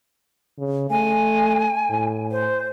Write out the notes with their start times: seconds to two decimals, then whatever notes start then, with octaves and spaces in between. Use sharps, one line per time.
0.59 C#3
0.90 A3 G#5
1.90 A2
2.32 C5